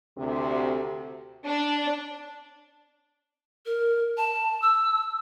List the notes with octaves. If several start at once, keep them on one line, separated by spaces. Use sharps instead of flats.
D2 C3
D4
A#4
A5
E6